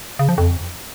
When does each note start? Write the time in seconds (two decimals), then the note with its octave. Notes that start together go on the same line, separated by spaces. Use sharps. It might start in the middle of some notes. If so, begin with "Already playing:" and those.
0.19 C#3
0.29 F3
0.38 F2